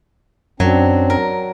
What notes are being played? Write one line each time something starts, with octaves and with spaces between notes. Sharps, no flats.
F#2 F#3 C4 D4
A#4